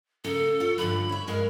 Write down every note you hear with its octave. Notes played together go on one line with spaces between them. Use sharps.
C#3 A#3 A4
F4 C#5
G2 D3 F3 B5
C#5 E5
G2 G#3 A#4 F5